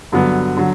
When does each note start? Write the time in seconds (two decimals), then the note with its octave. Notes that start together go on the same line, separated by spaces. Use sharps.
0.12 G2 D3 F#3 B3
0.57 D3 F#3